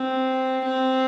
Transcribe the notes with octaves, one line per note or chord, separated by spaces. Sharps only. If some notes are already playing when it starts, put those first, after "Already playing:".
Already playing: C4
C4